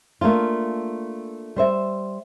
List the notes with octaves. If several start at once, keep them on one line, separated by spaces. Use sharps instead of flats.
A3 A#3 D4 F4
G3 C5 E5